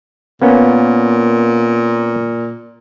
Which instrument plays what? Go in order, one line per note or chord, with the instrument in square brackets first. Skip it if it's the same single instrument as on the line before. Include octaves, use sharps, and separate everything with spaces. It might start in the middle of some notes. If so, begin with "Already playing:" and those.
[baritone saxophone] A#2 [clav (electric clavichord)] A#3 B3 C#4